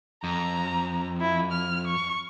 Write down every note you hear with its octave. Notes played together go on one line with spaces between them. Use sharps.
F2 A#5
E4
F6
C#6